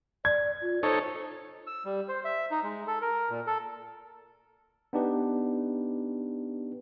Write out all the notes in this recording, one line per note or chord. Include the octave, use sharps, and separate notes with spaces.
D5 G#6
F4
D#4 A4 C5 C#5
E6
G3
C5
E5
D#4
G#3
A4
A#4
A#2
A4
B3 D4 D#4 G4 B4